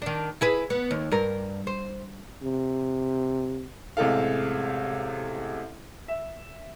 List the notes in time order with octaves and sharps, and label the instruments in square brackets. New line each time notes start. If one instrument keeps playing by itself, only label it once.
[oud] D#3 D4
E4 G#4 B4
B3
D#2
G2 A#4
C5
[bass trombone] C3
[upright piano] A1 C3 G#3 A4 F5
E5